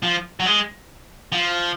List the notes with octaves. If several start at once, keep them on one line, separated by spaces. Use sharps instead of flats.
F3
F#3
G#3
F3